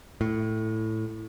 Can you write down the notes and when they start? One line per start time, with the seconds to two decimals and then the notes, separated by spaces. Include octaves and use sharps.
0.21 A2